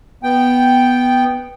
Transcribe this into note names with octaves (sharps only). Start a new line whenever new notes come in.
B3 G5